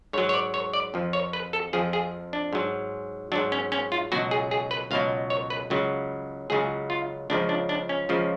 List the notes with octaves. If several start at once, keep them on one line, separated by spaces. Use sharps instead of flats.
G#2 F#3 C#5
C#5
D5
C#5
D5
F2 F3
C#5
B4
A4
F2 F3 G#4
G#4
D4
G#2 F#3
G#2 F#3 D4
C#4
C#4
F4
C#2 B2 F#3 F#4
G#4
G#4
B4
C#2 B2 F#3 F5
C#5
B4
C#2 C#3 F#3
C#2 C#3 F#3 G#4
F4
C#2 C#3 F3 D4
D4
D4
C#4
C#2 C#3 F3